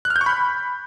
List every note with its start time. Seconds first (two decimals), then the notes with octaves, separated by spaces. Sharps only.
0.05 F#6
0.10 F6
0.16 G6
0.21 C#6
0.26 B5